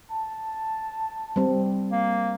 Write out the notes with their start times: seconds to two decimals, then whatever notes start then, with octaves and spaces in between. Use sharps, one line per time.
0.11 A5
1.36 G3 C4
1.92 A#3